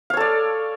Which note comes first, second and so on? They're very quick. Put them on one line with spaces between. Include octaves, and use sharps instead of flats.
F5 C#5 A4 D5